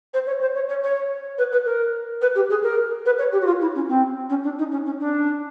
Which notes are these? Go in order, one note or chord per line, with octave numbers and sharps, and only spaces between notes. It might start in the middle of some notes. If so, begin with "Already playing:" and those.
C5
C#5
C5
C#5
C#5
C#5
B4
B4
A#4
B4
G4
G#4
A#4
B4
C#5
G4
F#4
F4
E4
C#4
C4
C#4
D4
D#4
C#4
C#4
D4